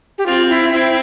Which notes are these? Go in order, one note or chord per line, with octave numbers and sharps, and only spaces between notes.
G4
C4 F4
E4
C4 E4